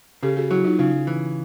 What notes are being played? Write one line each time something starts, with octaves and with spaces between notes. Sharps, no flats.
C#3 G4 A4
F#4 G#4
F#3 E4 F#4
D#4 F4
C#3 D#4 F4
E3